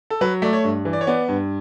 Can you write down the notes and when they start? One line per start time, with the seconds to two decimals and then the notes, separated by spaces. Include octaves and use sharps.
0.10 A4
0.21 F#3 B4
0.42 A3 D5
0.53 C#5
0.64 G2
0.85 E3
0.93 D5
1.01 C#5
1.07 B3 D5
1.28 G2